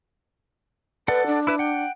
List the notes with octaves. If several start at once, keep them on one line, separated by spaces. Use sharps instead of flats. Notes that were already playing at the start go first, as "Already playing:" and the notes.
A4 B4 D5 F#5
D4
E4 B4 E5
F#5 G5